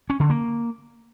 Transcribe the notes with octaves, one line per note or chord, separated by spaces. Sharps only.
C#4
D3
A#3